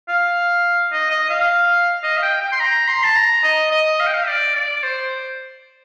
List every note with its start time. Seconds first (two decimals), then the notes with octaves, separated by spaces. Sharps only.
0.09 F5
0.92 D#5
1.10 D#5
1.29 F5
2.03 D#5
2.17 F5
2.22 G5
2.41 G5
2.52 C6
2.60 A#5
2.88 C6
3.03 A5
3.16 A#5
3.44 D#5
3.72 D#5
4.00 F5
4.07 G5
4.14 F5
4.27 D5
4.55 D5
4.83 C5